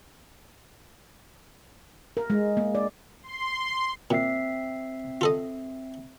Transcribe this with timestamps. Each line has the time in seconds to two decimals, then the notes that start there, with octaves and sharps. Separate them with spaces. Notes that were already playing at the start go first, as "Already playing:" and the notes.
2.17 A#4
2.30 G#3
2.57 A#3
2.75 D5
3.23 C6
4.11 A#2 C4 E5 C7
5.21 F4 A4 D#5